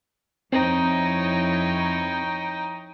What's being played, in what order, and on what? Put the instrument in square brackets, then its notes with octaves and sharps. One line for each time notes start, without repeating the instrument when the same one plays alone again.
[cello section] F2 E4 C#5 [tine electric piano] C4 [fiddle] D#4 G5